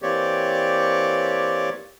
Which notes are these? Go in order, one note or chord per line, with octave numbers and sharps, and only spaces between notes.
E3 A#3 C4 G4 C#5 D5